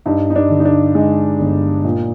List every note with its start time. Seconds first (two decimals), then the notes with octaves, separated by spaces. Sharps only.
0.06 G2 D#4
0.30 D#4
0.36 D4
0.50 D3
0.60 D#4
0.65 D4
0.95 G#3 D#4
1.40 G1
1.84 A#2